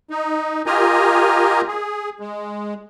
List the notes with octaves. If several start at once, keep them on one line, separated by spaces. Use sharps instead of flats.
D#4
F4 G4 A#4 D#5 G#5 A#5
G#4
G#3